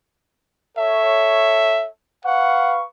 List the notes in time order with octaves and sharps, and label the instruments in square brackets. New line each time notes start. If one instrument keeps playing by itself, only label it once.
[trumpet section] A4 C#5 [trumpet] E5
[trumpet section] B4 F5 C#6 [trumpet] F#5